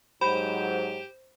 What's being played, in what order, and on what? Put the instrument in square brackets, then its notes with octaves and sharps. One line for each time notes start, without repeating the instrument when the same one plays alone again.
[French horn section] G#2 F#3 [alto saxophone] G4 [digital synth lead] C5 [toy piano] B5